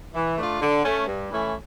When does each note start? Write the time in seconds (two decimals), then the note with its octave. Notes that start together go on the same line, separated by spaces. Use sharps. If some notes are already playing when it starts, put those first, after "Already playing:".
0.14 E3
0.38 A3 D4 F4
0.61 D3
0.84 A3 C#4
1.07 G2
1.30 E3 A3 C#4 E4